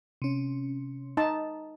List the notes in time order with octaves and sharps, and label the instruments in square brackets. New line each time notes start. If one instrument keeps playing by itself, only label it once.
[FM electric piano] C3 C#4
[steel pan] D#4 A5